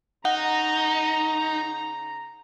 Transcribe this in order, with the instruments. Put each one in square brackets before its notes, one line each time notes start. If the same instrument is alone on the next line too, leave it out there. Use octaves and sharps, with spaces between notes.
[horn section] C#3 A#5 [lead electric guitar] D#4 [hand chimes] F#5